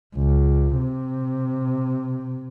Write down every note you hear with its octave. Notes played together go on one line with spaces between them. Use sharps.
C#2
C3